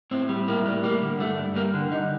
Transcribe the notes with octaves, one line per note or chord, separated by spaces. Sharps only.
A2 C4
G3
A2 A#3
G3
G3 A#3
D3
G2 A3
G2
G3 A#3
D3
G2 D#4